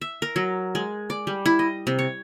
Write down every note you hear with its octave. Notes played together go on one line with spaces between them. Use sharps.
E5
A#4
F#3
G#3
D5
G3
E4
D#5
C3
C#5